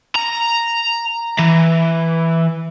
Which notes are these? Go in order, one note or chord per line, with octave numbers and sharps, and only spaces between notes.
A#5
E3